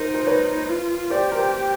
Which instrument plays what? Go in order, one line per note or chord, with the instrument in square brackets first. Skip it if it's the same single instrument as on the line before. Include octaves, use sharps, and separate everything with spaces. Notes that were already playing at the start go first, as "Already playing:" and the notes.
Already playing: [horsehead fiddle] D#4 [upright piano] A#4 C5
[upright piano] C5
B4 C#5
[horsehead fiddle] F4
[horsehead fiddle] G4 [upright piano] C5 D5
[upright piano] A#4 C5